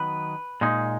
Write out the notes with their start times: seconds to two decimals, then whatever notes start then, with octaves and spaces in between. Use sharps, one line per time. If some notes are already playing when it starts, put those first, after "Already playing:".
Already playing: D#3 F#3 B3 B4
0.61 A#2 G#3 D#4